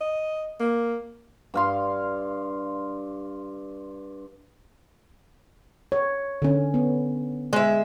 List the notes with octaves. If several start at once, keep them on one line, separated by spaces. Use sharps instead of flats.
D#5
A#3
G2 F5 C6
C#5
D3 C#4
B3
G#3 E5